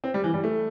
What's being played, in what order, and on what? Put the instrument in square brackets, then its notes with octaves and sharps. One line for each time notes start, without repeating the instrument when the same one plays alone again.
[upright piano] C4
G3
E3
G3
A3